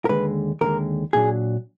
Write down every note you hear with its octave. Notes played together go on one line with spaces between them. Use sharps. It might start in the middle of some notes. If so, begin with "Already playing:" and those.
A#4
D#2 D3 G#3 B4
D#2 D3 G#3 A#4
A#2 F#3 D4 G#4